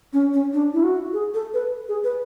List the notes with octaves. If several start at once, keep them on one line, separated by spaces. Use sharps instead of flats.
C#4
C#4
D4
E4
F#4
G#4
A4
B4
G#4
B4